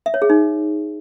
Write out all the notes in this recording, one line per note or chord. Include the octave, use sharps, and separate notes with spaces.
E5
C#5
G#4
D#4